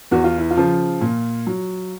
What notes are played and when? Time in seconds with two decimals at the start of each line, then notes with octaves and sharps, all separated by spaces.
0.11 E2 F#4
0.24 F4
0.38 E4
0.51 F4
0.57 C#3 F3
1.01 A#2
1.47 F#3